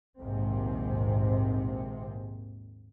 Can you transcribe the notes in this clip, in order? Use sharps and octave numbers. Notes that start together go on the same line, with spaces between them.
A#1 D#2 G#2 C3 C4